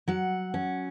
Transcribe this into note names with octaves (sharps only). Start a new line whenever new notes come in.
F#3 F#5
C#4